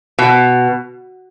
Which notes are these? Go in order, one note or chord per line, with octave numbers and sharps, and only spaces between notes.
B2